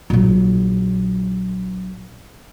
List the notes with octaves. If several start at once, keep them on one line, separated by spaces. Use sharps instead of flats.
A#1 F#3